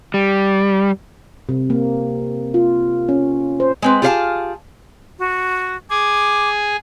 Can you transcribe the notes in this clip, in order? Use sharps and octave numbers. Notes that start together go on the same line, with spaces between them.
G3
C3
A#3
F4
C#4
C5
G#3 C4 B4
F4 G4 G#4 B4 F5 A5
F#4
G#4 G#5 D6